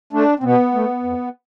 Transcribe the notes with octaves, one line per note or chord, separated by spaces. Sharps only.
A3 D4
C4
B2 B3
A3
F2